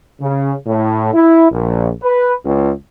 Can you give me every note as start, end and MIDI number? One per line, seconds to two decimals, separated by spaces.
0.21 0.53 49
0.67 1.14 45
1.14 1.46 64
1.51 1.90 34
2.03 2.33 71
2.45 2.71 37